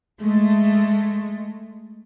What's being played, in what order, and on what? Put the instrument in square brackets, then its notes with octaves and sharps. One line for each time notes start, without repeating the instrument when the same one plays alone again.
[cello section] G#3 A3